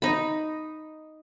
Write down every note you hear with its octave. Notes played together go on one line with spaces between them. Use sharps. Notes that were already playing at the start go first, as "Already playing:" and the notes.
D#4 B5